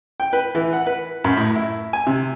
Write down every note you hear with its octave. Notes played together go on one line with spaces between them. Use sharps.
G5
B4
E3
F#5
B4
F#2
A2
E4
G#5
C3